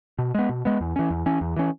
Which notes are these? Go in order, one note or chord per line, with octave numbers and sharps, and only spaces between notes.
B2
G#3 B3
B2
G#3 B3
E2
E3 C#4
E2
E3 C#4
E2
E3 C#4